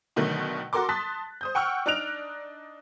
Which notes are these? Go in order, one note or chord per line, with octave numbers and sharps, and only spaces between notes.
B2 D3 D#3 F#3 A3
F#4 A4 A#4 C6 D6
A5 C6 D#6 F#6 A6 B6
C5 D#6 G6
F#5 G5 C#6 E6 F6
D4 D#4 F6 F#6 D7 F7